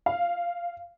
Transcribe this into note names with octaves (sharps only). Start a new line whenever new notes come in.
F5